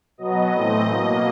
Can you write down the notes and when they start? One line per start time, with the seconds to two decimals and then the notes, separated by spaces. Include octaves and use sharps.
0.18 B2 F#3 B3 D#5
0.52 A2 E3 A3 C4
0.86 B2 F#3 A#3 D#5